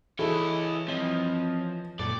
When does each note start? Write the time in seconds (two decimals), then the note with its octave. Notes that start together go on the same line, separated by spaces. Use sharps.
0.19 E3 E4 G#4 A4 C#5 D#5
0.88 F3 C4 C#5 D#5
1.99 F#2 A#2 A4 D5